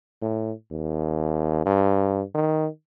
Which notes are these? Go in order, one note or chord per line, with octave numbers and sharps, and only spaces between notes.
A2
D#2
G2
D#3